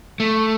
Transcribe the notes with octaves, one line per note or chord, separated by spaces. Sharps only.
A3